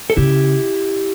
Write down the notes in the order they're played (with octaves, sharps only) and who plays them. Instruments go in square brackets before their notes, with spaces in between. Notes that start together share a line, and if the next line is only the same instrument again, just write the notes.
[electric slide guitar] A4
[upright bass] C#3 [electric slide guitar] E4 G4